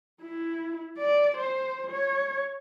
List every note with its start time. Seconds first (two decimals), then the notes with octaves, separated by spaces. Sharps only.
0.22 E4
0.98 D5
1.37 C5
1.91 C#5